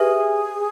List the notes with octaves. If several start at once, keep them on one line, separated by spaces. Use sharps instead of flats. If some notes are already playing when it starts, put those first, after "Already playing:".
Already playing: G4 G#4 B4 E5